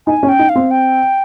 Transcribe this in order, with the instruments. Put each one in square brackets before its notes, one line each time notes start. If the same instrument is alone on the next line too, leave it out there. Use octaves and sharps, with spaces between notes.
[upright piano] D#4 [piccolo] G#5
[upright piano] C#4
[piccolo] G5
[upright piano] D#4
[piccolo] F5
[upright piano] C4
[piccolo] G5